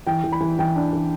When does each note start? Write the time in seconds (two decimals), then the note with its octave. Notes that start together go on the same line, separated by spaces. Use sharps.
0.07 E3 G5
0.24 E3
0.32 B5
0.40 E3
0.59 E3 G5
0.76 D4
0.93 E3